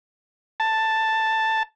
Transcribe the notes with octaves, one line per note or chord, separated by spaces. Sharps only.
A5